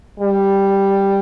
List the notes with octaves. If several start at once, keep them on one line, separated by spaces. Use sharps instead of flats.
G3